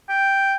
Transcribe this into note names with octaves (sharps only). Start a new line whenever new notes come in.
G5